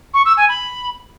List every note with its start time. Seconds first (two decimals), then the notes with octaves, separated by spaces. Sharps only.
0.13 C#6
0.25 E6
0.37 G#5
0.48 B5